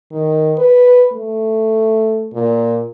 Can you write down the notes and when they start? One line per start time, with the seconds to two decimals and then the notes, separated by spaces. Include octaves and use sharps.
0.12 D#3
0.58 B4
1.12 A3
2.33 A#2